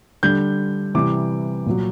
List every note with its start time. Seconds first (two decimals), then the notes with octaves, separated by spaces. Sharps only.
0.23 D3 G3 G6
0.94 C3 E3 G3 D6
1.66 A#2 F#3